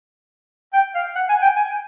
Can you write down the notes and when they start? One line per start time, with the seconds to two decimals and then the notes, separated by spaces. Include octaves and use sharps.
0.74 G5
0.95 F5
1.16 F#5
1.29 G#5
1.42 G5
1.56 G#5